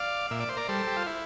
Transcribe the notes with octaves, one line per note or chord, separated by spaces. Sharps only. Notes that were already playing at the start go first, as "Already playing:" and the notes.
Already playing: D5 F5
A#2 E5
D5
C5
A#4 D5
G3 A4 C5
G4
F4
E4